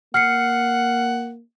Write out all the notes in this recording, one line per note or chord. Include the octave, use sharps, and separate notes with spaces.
A#3 F#5 F6 C7 C#7